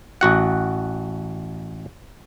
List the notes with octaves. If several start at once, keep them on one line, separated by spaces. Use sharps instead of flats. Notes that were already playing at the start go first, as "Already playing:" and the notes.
A1 F#4 F#5